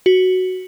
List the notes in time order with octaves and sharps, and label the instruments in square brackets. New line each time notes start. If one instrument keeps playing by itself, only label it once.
[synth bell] F#4